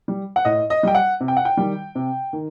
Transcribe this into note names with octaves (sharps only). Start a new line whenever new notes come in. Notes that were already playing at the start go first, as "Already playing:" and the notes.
G3
F#5
A2 D#5
D#5
G3 G5
F#5
C3
G5
F#5
G5
D#3 G3
C3
D#3